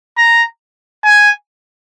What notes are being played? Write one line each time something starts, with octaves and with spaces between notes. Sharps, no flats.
A#5
G#5